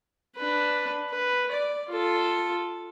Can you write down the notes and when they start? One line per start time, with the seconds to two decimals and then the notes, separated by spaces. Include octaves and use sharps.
0.37 D4 B4
1.10 B4
1.51 D5
1.89 F4 A4